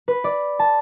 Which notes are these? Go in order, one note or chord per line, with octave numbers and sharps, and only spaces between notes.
B4
D5
A5